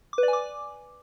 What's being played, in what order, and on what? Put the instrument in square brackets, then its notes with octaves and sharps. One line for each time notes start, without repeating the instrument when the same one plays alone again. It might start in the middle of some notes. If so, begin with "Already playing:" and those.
[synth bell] D6
B4
D5
G#5
D6